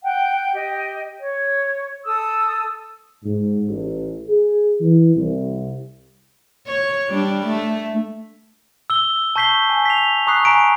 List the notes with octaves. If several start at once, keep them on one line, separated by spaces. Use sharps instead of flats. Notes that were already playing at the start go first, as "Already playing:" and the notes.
F#5 G5
G4 D#5
C#5
A4 D#6 E6
G#2
A1
G#4
E3
C2
C#5
G3 D4
A3
E6 G7
A5 C#6 G6 B6 C7 G7
G#5
B6 C7 F7
A#5 C#6 D#6 F#6 C7
G#5 A#5 B6 D7